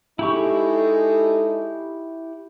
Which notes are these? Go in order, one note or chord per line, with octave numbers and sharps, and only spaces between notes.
G#3 D#4 E4 G4 A4 C#6